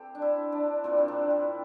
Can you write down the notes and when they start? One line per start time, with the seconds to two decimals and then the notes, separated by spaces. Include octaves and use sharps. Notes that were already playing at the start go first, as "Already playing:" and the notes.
Already playing: E3 C4 G4 A4 C5
0.15 D4
0.22 E4
0.52 D4
0.84 A#2 G3 A#3 C4
0.98 C4
1.08 D4
1.30 E4